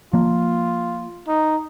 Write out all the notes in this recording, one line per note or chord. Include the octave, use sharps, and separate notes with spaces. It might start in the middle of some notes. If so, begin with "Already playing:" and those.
F3 A#3 F4
D#4